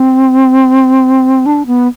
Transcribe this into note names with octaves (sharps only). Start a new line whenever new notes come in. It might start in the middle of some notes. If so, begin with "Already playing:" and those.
Already playing: C4
D4
B3